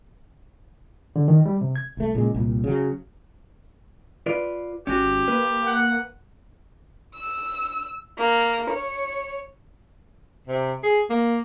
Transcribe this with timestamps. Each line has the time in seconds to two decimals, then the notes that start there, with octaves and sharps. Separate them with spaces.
1.16 D3
1.28 D#3
1.46 G3
1.61 C3
1.76 G#6
1.97 C2 A3
2.15 A#2 C#3 G#3
2.34 C2 A#2
2.64 C#3 F#3
4.26 F4 B4 D5
4.87 G#1 C#4 F#4 G4
5.28 A#3 B4
5.67 F#5
7.16 E6
8.18 A#3
8.71 C#5
10.47 C3
10.83 G#4
11.10 A#3